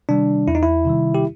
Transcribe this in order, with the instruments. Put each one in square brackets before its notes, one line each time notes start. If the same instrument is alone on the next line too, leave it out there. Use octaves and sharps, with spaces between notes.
[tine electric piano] C3 D#3 G3 D4
E2 E4
D#4
E4
C3 D#3 G3
G4